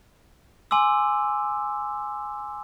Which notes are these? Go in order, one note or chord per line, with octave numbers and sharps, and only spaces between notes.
G#5 C6 D6 E6